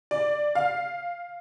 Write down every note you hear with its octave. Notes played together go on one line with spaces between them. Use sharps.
D5
F5